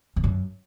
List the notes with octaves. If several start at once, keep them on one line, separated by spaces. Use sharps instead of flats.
F2
F#2